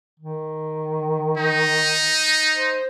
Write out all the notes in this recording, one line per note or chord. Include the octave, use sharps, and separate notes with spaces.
D#3
D#4
C5